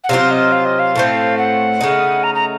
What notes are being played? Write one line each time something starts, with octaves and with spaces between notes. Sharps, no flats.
F#5
C3 F#3 C4 F4 F5
D#5
F5
D#5
F5
A2 A3 C4
F#5
C#3 A3 D#4
A#5
A#5